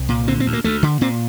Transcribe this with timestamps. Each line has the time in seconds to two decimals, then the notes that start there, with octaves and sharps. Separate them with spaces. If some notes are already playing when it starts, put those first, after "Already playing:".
Already playing: C2
0.09 A#2
0.28 D3 C4
0.40 C4
0.46 D2
0.53 A#3
0.64 D2 A3
0.83 D3
1.01 A#2 C4